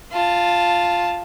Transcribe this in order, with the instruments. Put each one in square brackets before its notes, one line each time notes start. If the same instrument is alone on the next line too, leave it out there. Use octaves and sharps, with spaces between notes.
[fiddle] F4 A5